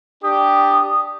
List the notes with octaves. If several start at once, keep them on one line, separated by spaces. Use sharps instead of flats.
D4 G4 D#6